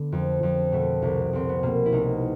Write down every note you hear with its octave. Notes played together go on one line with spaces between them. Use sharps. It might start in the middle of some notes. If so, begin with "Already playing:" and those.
Already playing: D3 B3
F2
F2
B2 A3
C2
C2 C4
B3
B2 A#3
E4
C2 D#4